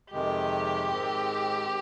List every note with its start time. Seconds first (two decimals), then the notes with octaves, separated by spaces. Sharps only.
0.12 F2 C3 D#3 G#3 G4
0.89 G#2 D#3 G#3 C4